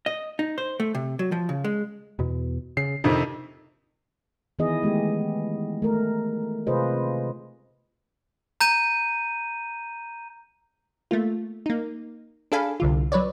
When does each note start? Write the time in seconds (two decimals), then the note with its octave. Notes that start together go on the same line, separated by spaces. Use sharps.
0.06 D#5
0.39 D#4
0.58 C5
0.80 A3
0.95 C3
1.19 F#3
1.32 F3
1.49 C#3
1.64 G#3
2.19 E2 B2
2.77 C#3 C7
3.04 F2 C3 D#3 D4
4.59 D#3 E3 B3 E4 G#4 D#5
4.83 G#3 A3 B3 G4
5.82 A3 A#4
6.67 C3 F4 G#4 B4 C5 D#5
8.61 A#5 G6 D#7
11.11 A3 A#3 F4
11.66 A#3 D#4
12.52 D4 G#4 A4 F5 G#5 B5
12.80 C2 D3 F4
13.12 F#3 B4 C#5 D5